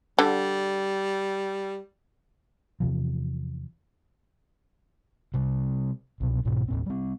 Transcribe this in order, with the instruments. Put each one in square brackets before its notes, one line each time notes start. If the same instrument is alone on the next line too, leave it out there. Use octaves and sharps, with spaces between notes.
[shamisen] D3 [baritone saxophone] G3
[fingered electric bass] E2 C3 F3
C3 G3
C2 B2
B1 G#2 B2 D3
D#2 A2 C4
G3 C4